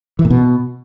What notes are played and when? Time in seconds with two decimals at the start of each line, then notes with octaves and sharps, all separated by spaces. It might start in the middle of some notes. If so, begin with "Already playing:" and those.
0.19 E3
0.25 A#2
0.30 B2